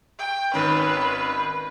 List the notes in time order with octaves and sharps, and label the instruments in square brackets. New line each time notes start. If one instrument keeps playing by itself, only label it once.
[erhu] G5
[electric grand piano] G#1 D#3 C#4 [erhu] B4